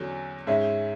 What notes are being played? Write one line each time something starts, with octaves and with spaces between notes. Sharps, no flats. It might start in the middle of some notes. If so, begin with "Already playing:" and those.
Already playing: E2 D3 F#3 C#4
G#2 G#3 C#4 E5